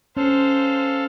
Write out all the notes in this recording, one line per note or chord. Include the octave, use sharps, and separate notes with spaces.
C#4 A4 C5 F5